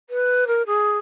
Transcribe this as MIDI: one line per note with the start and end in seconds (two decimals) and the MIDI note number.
0.10 0.44 71
0.47 0.62 70
0.66 0.98 68